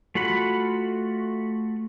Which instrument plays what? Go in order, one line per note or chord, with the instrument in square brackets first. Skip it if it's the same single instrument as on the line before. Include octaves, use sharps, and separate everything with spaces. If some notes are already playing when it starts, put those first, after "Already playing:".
[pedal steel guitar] A3 F4 F#4 F#5 B5